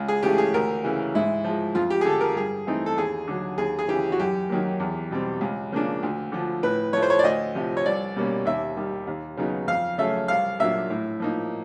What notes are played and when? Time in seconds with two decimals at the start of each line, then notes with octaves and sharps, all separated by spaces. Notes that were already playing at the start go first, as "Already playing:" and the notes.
Already playing: C#2
0.08 G#4
0.23 C#3 E3 A3 G4
0.38 G#4
0.54 D2 A#4
0.84 C#3 E3
1.15 G#2 E4
1.44 F3 G#3
1.75 F2 F4
1.90 G4
2.01 G#4
2.05 D3 F3 A4
2.21 A#4
2.36 G2 G#4
2.67 E3 A3 C4 D#4
2.86 A4
2.97 D#2 G#4
3.28 D3 F#3
3.58 D#2 G#4
3.79 G#4
3.88 C#3 E3 G4
4.12 F#4
4.20 F#2 G4
4.49 D#3 F#3 A#3
4.80 E2
5.11 B2 G3 C4
5.41 C#2
5.72 C#3 F3 A#3 D4
6.03 D2
6.32 D3 F3
6.63 A2 B4
6.93 F3 A3 C#5
7.03 C5
7.10 C#5
7.19 D5
7.24 D2 D#5
7.55 C3 F3
7.77 C#5
7.86 C2 D5
8.16 B2 G3 A#3 C#4
8.46 D#2 E5
8.76 D#3 G3
9.07 D#2
9.37 C#3 F#3 B3 D#4
9.68 F2 F5
9.98 C#3 F#3 A3 C#4 E5
10.28 C2 F5
10.59 A#2 F#3 A#3 D4 E5
10.90 A2
11.20 F3 A#3 D#4